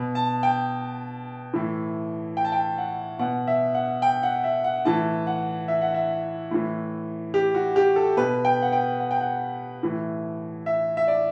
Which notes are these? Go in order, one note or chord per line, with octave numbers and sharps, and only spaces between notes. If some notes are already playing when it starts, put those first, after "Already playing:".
Already playing: B2
A5
G5
A2 E3
G5
A5
G5
F#5
B2 F#5
E5
F#5
G5
F#5
E5
F#5
A2 E3 A5
F#5
E5
F#5
E5
A2 E3
G4
F#4
G4
A4
B2 B4
G5
F#5
G5
F#5
G5
F#5
A2 E3
E5
E5
D5